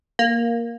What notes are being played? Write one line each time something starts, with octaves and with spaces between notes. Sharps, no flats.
A#3